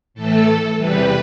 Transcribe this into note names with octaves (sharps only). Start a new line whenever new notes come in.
A2 E3 A3 A4
E2 C3 E3 G3 B4